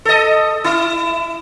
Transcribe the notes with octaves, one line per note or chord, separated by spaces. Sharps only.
A4 D#5
E4